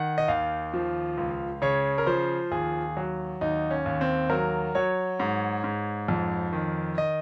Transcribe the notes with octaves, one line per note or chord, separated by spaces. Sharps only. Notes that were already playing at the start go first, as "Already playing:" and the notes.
Already playing: D#3 F#5
D#5
D#2 F5
F3
C#2
C#3 C#5
A#4
F3 C5
D#2 G#4
F#3
D#2 D#4
C#4
D#2
C4
F#3 A#4
F#3 C#5
G#2
G#2
F2
D#3
D#5